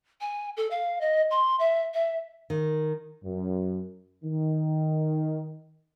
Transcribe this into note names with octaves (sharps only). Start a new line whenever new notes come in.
G#5
A4
F5
D#5
C6
E5
E5
D#3
F#2
D#3